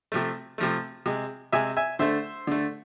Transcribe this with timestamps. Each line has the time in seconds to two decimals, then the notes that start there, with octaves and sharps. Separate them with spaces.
0.12 C3 F3 A3
0.58 C3 F3 A3
1.06 C3 G#3
1.52 C3 G#3 E5 G#5
1.77 E5 G#5
1.99 D3 A3 C5 E5
2.47 D3 A3